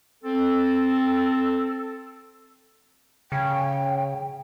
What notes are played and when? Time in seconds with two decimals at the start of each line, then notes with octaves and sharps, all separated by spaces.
0.24 C4 A4
3.32 C#3 G5